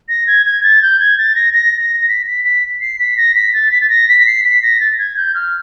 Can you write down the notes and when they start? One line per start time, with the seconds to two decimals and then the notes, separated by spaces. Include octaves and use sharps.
0.08 A#6
0.27 G#6
0.46 G#6
0.63 A6
0.82 G6
0.99 G#6
1.18 A6
1.35 A#6
1.53 A#6
1.81 A#6
2.08 B6
2.26 B6
2.44 B6
2.80 C7
2.99 B6
3.17 A#6
3.34 B6
3.53 A6
3.71 B6
3.81 A6
3.89 A#6
4.08 B6
4.26 C7
4.44 B6
4.62 A#6
4.80 A6
4.98 G#6
5.16 G6
5.34 F6